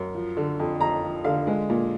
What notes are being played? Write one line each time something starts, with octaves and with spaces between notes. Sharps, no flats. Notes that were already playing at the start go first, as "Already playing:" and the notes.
Already playing: F#2
F3
D3
F2
F2 A#5
F3
D3 F5
G#3
A#2